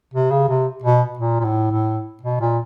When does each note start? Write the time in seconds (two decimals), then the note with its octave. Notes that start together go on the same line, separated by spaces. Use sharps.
0.14 C3
0.31 C#3
0.49 C3
0.83 B2
1.19 A#2
1.40 A#2
1.45 A2
1.71 A2
2.23 B2
2.41 A#2